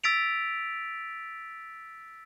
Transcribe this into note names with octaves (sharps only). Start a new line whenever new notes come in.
E6 A6 B6 D7 F7